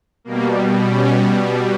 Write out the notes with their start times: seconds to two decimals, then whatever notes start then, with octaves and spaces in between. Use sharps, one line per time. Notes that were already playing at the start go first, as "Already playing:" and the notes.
0.24 B2 G3 A#3
0.89 C#4